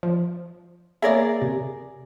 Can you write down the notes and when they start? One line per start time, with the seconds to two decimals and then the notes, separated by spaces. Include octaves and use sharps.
0.03 F3
1.02 A#3 G#4 A#4 C#5 D5 E5
1.42 C3